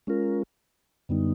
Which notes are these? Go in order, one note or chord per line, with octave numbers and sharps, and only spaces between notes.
G#3 C#4 F4 A#4
F#2 D3 G3 B3 D#4